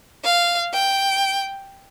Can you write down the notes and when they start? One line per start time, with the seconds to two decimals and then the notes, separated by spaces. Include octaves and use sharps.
0.24 F5
0.73 G5